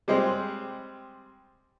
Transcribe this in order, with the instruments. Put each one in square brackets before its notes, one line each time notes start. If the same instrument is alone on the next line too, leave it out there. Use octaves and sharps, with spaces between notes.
[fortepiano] G3 G#3 C4